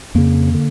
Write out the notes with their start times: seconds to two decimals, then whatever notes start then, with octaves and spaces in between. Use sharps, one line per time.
0.15 F2 C#3 A#3
0.54 D3